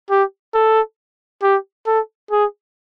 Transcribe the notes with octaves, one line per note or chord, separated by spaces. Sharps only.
G4
A4
G4
A4
G#4